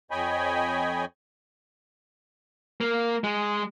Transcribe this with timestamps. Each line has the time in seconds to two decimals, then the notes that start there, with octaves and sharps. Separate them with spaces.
0.11 F2 C#5 D#5 G5 G#5 B5
2.81 A#3
3.24 G#3